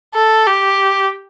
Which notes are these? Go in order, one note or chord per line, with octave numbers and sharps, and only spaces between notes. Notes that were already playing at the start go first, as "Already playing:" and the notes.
A4
G4